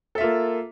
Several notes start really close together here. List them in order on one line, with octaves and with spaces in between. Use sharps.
A4 E5 F4 A#3